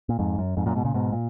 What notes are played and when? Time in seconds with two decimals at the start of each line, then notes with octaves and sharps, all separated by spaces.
0.09 A#2
0.19 F2 G#2
0.38 F#2
0.57 F2 G#2
0.66 F#2 A#2
0.75 G#2 B2
0.85 A#2 C#3
0.94 G#2 B2
1.12 A#2